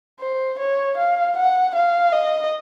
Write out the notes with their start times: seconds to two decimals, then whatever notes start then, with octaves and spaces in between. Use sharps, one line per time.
0.20 C5
0.59 C#5
0.97 F5
1.36 F#5
1.75 F5
2.13 D#5